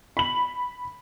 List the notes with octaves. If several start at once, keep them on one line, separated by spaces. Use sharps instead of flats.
B5 F#7